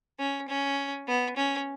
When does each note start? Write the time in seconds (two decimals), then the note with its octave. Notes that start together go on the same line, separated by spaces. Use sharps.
0.19 C#4
0.49 C#4
1.07 B3
1.37 C#4